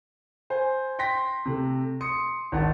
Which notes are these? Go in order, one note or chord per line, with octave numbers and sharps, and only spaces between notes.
C5 G#5
G5 C6 A#6 B6
C3 A3
C6 D#6 C#7
G#1 D#4 F#5 A5